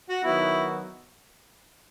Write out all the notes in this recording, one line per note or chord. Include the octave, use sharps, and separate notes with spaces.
F#4
D#3 F#3 B3 D#4 E4 F#4